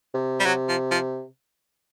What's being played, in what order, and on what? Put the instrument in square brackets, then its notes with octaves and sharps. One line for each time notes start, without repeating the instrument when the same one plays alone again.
[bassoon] C3
[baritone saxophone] G3
[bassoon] C3 [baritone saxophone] F#3
[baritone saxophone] F3
F3